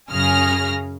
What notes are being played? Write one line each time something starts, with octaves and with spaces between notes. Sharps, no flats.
F#2 C#3 G#4 F6 A#6